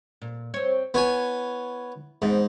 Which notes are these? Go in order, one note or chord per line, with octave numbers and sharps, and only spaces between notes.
A#2
C4 C#5
B3 E4 C#5 G#5
E2 G#2 B3 C4